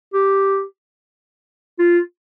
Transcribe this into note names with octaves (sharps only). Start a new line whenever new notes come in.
G4
F4